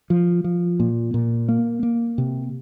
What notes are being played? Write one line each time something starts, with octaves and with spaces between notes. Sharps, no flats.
F3
F3
A#2
A#2
A#3
A#3
C3